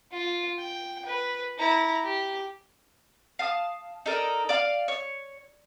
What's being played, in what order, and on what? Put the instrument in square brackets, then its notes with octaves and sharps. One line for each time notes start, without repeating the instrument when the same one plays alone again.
[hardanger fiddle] F4
G5
B4
E4 A#5
G4
[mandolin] F5 A5 D#6
D#4 A4 A#4 D5
D5 F5
C#5